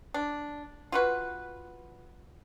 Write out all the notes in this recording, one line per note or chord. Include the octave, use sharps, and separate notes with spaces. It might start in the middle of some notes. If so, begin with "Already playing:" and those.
D4
F4 F#4 B4